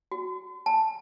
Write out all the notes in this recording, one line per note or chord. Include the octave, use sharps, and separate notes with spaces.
F#4
A5